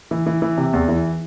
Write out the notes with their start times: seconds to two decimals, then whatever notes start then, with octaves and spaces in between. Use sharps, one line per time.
0.11 E3
0.26 E3
0.42 E3
0.58 C3
0.73 E2
0.88 E3